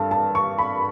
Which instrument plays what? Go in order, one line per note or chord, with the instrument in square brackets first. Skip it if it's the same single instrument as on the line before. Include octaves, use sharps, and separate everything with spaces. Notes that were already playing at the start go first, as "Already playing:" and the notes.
Already playing: [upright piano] G2 A4 A5
A5
C#6
B5